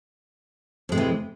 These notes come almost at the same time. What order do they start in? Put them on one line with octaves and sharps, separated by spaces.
F2 G#3 C3 E3